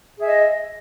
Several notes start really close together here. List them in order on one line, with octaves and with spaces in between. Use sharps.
G#4 E5 D#5